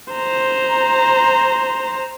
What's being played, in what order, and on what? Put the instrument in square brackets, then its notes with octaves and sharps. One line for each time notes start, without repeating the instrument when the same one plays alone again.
[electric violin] C5 A#5